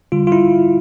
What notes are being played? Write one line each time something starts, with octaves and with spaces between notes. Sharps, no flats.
D3 G3 F4
F4
E4